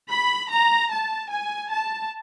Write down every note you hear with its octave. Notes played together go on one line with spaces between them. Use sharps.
B5
A#5
A5
G#5
A5